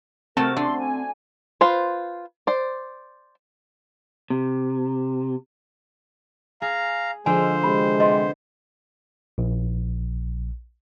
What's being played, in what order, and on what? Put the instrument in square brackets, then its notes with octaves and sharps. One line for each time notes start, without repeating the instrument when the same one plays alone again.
[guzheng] C3 A3 F#4 [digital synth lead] C4 [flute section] A#4 [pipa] A5
[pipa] D3 [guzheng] D4 [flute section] C6
[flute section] G#5
[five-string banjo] F4 B4 C5
C5 D5
[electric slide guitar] C3
[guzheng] G#4 [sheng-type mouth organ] F5 A#5
[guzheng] D3 F3 [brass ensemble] G#3 [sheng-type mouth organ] C5 [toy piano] G#5
[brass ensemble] C3 G#3 [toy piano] B5
[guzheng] B3 [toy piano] D#5 C6
[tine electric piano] A#1